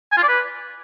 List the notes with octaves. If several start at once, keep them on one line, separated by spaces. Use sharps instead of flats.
G#5
F4
D5
B4